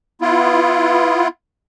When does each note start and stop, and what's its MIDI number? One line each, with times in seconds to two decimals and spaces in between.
0.22 1.28 59
0.22 1.28 64
0.22 1.28 65